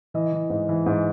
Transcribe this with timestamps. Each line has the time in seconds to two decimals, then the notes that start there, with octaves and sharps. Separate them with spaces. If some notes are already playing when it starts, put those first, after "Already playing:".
0.14 E3 D#5
0.33 E3
0.50 G#2
0.69 E3
0.86 G#2